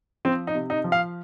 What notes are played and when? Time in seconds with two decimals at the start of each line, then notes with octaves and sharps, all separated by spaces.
0.25 F3 C4
0.47 D#4
0.55 C3
0.70 D#4
0.84 F3
0.92 F5